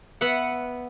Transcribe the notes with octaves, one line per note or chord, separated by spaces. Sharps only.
B3 B4 E5 F#5